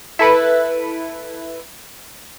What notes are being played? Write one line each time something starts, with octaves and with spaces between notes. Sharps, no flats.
E4 A4 B4